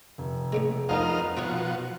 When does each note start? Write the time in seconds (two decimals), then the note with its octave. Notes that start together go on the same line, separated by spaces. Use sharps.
0.18 F1
0.52 A2 C#3 G#3
0.89 F2 B3 D#4 A#4 D#5 F5 F6
1.37 B2 F3 C4 E4 F#4 C#5